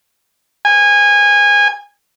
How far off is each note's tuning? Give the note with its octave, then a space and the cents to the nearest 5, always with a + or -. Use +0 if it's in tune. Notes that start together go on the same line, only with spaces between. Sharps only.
G#5 -20